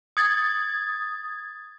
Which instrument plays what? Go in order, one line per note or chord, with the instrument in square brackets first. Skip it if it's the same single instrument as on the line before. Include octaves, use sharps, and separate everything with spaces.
[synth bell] D#6 G#6 A6